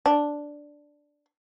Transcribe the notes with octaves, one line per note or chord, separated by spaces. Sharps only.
D4